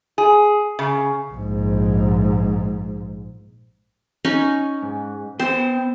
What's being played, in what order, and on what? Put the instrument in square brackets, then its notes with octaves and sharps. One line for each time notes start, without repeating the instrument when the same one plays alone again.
[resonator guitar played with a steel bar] G#4
C#3
[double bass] A#1 G#2
[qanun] C#4 D#4
[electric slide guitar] G#2
[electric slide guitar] B3 G5 [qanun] C5